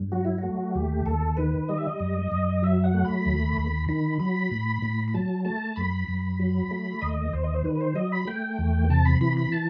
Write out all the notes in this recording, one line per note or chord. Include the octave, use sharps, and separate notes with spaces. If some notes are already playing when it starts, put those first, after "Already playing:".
Already playing: G2
F#3 F#4
E4
A3 F#4
D#2 G4
D#2 A4
D#3 B4
G3 D#5
E5
D#5
F#2
F#2
F#3 E5
F#5
A3
B5
D#2
D#2
D#3 B5
F#3 B5
A2
A2
B5
F#3 A5
A3 A5
F#2 B5
F#2
F#3
A3
D#2 D#5
D#2 C5
D#5
C5
D#3 B4
B4
C5
F#3 D#5
B5
A3 G5
E2
C3 A5
B5
E3 B5
B5
A5